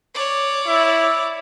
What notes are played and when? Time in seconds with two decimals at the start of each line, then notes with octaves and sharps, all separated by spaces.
0.15 C#5 D5
0.67 E4